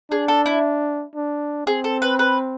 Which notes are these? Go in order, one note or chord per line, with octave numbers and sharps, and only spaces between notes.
D4 G#4
A4
E4
D4
C4 G#4
A4
B4
B4